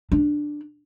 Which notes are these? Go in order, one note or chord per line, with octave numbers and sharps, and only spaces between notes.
D4